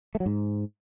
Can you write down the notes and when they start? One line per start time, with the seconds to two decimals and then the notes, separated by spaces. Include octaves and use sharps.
0.15 A3
0.20 F#3
0.26 G#2